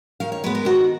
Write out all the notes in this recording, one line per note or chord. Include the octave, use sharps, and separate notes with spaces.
D#3 F5
C#5
G#3 B3 B4
A#4
D#3 F#4